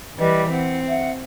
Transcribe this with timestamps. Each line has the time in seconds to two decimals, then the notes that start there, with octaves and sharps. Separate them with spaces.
0.18 E3 G3 B4 D#5 G5
0.50 C4 F#5
0.88 E5 F#5